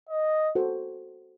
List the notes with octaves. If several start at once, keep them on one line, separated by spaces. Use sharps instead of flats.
D#5
F#4 A4 C5